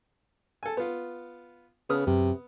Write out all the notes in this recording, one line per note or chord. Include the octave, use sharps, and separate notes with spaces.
A4 G#5
B3 F4
C#3 B3 D#6 F6
F#2 C3